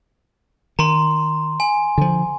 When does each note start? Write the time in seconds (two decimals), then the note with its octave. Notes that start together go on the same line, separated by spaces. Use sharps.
0.79 D#3 A#5 C6
1.60 G#5
1.98 D3 F3